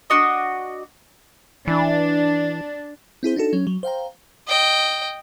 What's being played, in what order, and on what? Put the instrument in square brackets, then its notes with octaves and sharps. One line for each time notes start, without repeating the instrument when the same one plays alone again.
[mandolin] D4 F#4 D#5
[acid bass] E3 [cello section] D4
[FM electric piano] C4 E4 G#4 C5
D4 D#4 F#4 A4
F#3 C#4
F#3
C5 F5 G5 A#5
[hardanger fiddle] D#5 G5